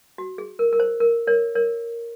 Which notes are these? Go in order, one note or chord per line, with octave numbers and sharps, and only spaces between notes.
F#4
G#4
A#4
A#4
C5
A#4
A#4 C#5
A#4 C#5